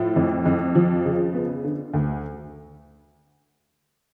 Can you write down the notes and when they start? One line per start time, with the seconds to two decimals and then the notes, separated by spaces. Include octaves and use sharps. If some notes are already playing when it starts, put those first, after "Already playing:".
Already playing: A2 F3
0.16 F2
0.46 F2
0.75 F3
1.05 C#3
1.34 B3
1.64 D3
1.94 D2